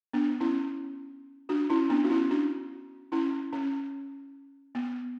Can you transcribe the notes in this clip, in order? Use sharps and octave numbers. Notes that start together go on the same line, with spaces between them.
B3 D4
C#4 E4
D4 F#4
C#4 E4
B3 D4
F#4
C#4 E4
D4 F#4
C#4 E4
C#4
B3